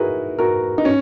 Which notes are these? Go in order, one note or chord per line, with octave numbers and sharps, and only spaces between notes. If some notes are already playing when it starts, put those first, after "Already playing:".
Already playing: D#4 E4 F#4 G#4 A#4 B4
F#4 A#4
D#4
C#4